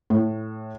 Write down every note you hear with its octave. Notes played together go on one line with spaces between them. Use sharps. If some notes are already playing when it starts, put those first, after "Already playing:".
A2